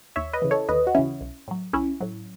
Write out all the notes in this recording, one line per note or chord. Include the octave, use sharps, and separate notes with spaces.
D#2 C#5 E5
B4 D#5
C#3 E3
A4 C#5
D#2 B4 D#5
F#4
C#3 E3 C#4 E4
B1
A2 F#3
B1 C#4 E4
A2 F#3